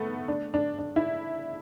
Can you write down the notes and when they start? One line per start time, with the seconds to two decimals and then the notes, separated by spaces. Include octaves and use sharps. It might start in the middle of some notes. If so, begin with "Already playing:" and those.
Already playing: A3 B3
0.28 D4
0.54 D4
0.79 D4
0.96 E4